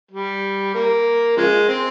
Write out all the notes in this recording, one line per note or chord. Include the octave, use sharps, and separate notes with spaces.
G3
A#3
C#3 F3 G#3
C4